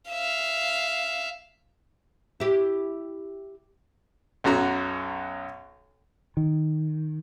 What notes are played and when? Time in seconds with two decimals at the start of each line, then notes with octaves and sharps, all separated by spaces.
0.11 E5 F5
2.40 E4 G4
4.44 B1 F#2 F#4 A#5
6.37 D#3